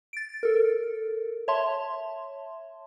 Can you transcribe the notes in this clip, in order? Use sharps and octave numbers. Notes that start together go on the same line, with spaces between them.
A6 D7
A4 A#4
C#5 E5 A5 C6